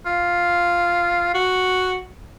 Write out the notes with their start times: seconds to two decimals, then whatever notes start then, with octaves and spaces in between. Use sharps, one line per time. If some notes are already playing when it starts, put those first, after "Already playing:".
0.06 F4
1.34 F#4